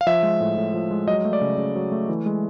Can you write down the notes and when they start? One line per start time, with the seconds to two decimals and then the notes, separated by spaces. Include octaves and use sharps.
0.01 F5
0.07 F3 E5
0.23 G#3
0.40 A2
0.57 A2
0.74 F3
0.91 G#3
1.08 F#3 D#5
1.25 A3
1.33 D5
1.41 C#3
1.58 C#3
1.76 F#3
1.92 A3
2.09 E3
2.26 G#3